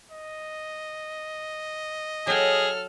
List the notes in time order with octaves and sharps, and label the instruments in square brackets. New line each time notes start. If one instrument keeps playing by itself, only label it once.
[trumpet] D#5
[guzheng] F#3 G5 [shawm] G#4 [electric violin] A4 F6